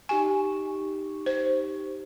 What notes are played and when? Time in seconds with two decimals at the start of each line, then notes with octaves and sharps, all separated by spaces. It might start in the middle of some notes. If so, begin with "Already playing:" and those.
0.09 D#4 G4 G#5 C#6
1.26 C5